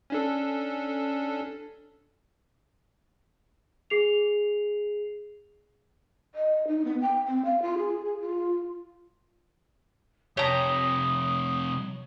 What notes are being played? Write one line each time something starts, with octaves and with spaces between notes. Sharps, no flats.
C#4 D4 A4
G#4 C7 F7
D#5
D#4
B3
G5
C4
F5
F4
G#4
G#4
F4
F2 C3 G4 C#5 A#5 D#6